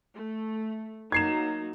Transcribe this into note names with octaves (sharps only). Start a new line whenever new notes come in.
A3
F#3 A#3 D#4 G#6 C7 E7